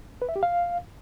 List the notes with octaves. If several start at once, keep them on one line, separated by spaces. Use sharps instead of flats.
B4
E5
G4
F5